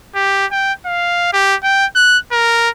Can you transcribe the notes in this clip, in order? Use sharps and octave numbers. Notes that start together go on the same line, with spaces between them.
G4
G5
F5
G4
G5
F#6
A#4